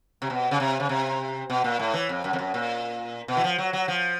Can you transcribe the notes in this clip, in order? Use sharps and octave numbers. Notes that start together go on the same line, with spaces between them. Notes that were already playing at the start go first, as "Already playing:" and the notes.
C3
B2
C#3
C3
C#3
C3
B2
A#2
A2
E3
F2
F#2
F2
F#2
A#2
B2
E3
F3
F#3
F#3
F3